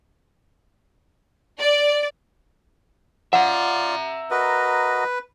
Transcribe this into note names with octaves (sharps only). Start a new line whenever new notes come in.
D5
F4 D5 E5 F#5 A#5
F#4 A#4 B4 D#5